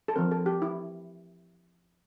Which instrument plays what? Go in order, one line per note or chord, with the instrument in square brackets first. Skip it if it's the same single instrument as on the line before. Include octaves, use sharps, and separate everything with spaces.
[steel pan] A4
F3 C4 A#4
A4
G4
E4